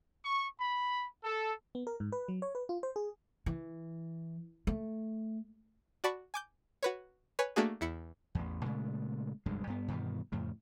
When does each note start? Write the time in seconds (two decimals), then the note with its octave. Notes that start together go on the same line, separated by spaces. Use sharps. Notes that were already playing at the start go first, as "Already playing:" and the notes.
0.24 C#6
0.60 B5
1.24 A4
1.75 B3
1.87 A#4
2.00 G#2
2.12 B4
2.28 F#3
2.42 C#5
2.55 B4
2.69 F4
2.83 C5
2.96 G#4
3.46 E3
4.67 A3
6.04 F#4 D5 A5 B5 C#6
6.34 G#5 D6 G6
6.83 F#4 B4 C#5
7.39 B4 C#5 G#5
7.56 A3 A#3 D4 F#4 G#4
7.81 E2 E4 C#7
8.35 A1 E2
8.63 A#2 C#3 G#3 A3
9.46 F1 D2 G2 G#3
9.67 G2 B3
9.88 G2 B2 D#3 E3
10.32 F2 A2 C#3